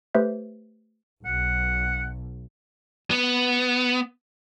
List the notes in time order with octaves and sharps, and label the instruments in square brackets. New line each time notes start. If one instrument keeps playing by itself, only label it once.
[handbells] A3 G4 B4 C5 E5 G6
[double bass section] B1 [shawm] F#5
[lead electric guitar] B3